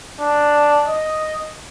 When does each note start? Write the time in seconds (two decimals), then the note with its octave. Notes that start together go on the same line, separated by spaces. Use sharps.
0.20 D4
0.87 D#5